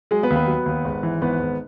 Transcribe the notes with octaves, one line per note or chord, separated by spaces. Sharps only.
F#3 G#3 G#4
B3 B4
D#2
B3 B4
F#3
D#2
G#1
E3
G#1 B3 B4
G#1